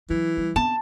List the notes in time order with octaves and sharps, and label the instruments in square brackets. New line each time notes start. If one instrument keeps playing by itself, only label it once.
[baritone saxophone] E3 [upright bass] F#3
[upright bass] G3
[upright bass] B3 C4 [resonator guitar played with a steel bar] A5